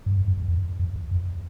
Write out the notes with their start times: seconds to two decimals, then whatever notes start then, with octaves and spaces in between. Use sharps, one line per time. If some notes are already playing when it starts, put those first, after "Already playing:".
0.06 G2
0.16 F#2
0.28 G2
0.37 F2
0.48 E2
0.79 F2
0.96 E2
1.11 F2